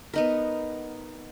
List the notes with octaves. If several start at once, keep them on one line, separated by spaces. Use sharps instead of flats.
B3 D#4 A#4